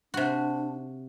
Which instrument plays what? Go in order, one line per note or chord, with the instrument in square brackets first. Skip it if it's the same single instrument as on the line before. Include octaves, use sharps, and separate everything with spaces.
[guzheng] C3 F#4 [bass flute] D4